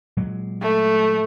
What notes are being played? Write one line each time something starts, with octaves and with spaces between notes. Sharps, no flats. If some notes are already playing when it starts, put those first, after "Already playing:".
A#2 F#3 G#3
A3